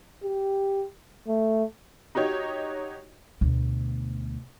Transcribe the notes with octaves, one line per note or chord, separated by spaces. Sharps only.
G4
A3
D#4 F#4 G4 C#5 D#5
D2 B2